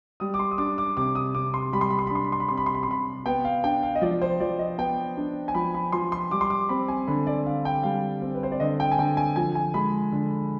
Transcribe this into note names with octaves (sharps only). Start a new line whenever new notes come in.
G3 D#6
D6
C6
D#6
D4 D6
D6
C3 D6
D#6
C3 D6
C6
G3 B5
C6
B5
C6
B5
D4 C6
B5
C6
B5
C3 C6
B5
C6
B5
C6
C3 B5
B3 G5
F5
D4 G5
F5
D#5
F3 D5
C5
F3 D5
D#5
B3 G5
D4
G#5
F3 B5
B5
F3 C6
C6
G3 D6
C6
D6
C4 B5
G#5
D3 B5
D5
D3 F5
G5
G3 F5
C4
B4
C5
D5
D3 D#5
G5
G#5
D3 G5
G#5
F3 G#5
G#5
G#3 B5
D3